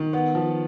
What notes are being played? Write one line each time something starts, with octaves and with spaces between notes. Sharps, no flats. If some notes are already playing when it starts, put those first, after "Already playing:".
Already playing: D#3
B3
F3